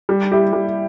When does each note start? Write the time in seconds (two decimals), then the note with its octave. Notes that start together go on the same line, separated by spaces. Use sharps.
0.09 G3
0.32 E4 G4
0.53 G3